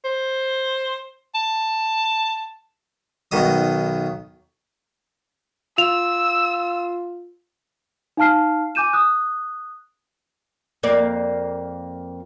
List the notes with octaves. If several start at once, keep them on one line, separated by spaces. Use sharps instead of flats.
C5
A5
B1 B2 D#3 D#5 D#6
F4 E6 F7
D#4 F5 A5 F6 C7
G#5 D6 G6 D#7 E7
D#6 F#6
F2 A#3 D5